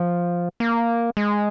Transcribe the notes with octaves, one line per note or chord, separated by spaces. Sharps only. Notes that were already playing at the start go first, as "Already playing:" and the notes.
Already playing: F3
A#3
G#3